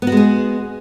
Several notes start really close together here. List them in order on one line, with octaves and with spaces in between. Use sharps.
B3 F#4 G#3 G#4